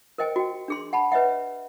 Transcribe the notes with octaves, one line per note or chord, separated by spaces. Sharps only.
A#4 C5 D#5 G5 G#5
F#4 G5
D4 G#4 C6
F#5 A5 B5
B4 C#5 D#5 E5 F#5